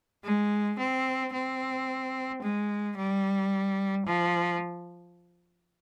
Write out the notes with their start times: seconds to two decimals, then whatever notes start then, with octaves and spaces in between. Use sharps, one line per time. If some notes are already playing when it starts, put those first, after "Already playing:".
0.24 G#3
0.78 C4
1.33 C4
2.42 G#3
2.96 G3
4.06 F3